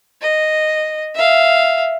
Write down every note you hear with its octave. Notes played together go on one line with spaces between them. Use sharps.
D#5
E5 F5